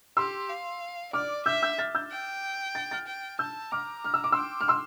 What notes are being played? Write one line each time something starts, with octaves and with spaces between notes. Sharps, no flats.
G4 C6 E6
F5
D5 D6 F6
E5 E6 G6
E6 G6
F6 A6
E6 G6
G5
A6
F6 A6
G5
A5 E6 G6
A#5 D6 F6
F6
E6
D6
G5 C6 E6
F6
C6 E6